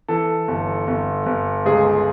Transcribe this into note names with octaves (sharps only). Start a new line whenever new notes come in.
E3 A4
G1
G1
G1
C#2 G#4